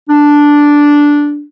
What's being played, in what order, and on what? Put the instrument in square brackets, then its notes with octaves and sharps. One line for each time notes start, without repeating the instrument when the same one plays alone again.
[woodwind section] D4